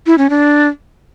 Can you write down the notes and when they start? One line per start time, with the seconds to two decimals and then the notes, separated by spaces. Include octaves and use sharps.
0.06 E4
0.18 C#4
0.30 D4